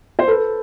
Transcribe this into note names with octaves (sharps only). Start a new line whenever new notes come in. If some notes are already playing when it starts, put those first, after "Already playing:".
C5
A4 B4